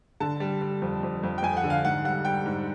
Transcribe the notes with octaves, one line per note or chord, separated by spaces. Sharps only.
D3 A5
G3
G3
F2
F2
F2
G5
F2 G#5
F#5
D3
F5
G#2 F#5
G3 F#5
G3 G5
G#2